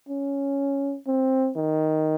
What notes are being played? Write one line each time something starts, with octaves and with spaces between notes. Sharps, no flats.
C#4
C4
D#3